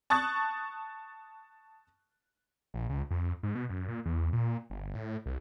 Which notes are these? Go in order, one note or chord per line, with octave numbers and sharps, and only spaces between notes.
A5 C#6 D#6 F#6 A6
A#1
C#2
F2
G#2
B2
F#2
A#2
E2
A#2
G1
A2
C2